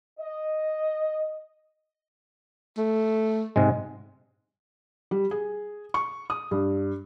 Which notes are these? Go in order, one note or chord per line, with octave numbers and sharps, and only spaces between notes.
D#5
A3
G#2 C3 G#3
G3
G#4
C#6
D#6
G2